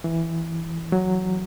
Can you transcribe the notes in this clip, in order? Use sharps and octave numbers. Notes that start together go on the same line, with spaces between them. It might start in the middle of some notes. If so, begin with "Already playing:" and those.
E3
F#3